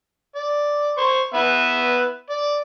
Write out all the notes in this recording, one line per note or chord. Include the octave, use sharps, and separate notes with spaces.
D5
C5 C#6
B3 B4 E5
D5